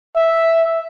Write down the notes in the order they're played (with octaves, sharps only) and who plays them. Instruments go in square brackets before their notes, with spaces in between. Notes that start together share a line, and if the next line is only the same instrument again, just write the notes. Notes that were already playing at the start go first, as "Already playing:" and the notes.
[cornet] E5